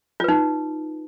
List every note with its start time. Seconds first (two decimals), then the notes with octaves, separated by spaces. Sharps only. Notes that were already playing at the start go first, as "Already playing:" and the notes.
0.20 F4
0.24 B4
0.28 D#4